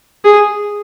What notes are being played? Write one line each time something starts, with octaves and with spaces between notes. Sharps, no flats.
G#4